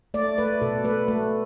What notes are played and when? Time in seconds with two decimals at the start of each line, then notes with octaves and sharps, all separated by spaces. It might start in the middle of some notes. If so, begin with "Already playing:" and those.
0.14 A3 D5
0.38 A3 B4
0.61 B2 A4
0.84 A3 B4
1.08 A3